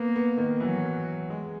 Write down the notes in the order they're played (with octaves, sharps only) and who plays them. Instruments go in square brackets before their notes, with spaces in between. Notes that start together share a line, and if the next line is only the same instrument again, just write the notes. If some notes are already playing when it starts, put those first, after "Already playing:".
Already playing: [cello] A#3 [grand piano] B3
[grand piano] B3
D#3
[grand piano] E3 [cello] F#3
[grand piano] G#3